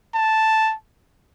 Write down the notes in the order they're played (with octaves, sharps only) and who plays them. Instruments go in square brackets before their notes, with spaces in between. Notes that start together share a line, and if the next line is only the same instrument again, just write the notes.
[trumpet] A5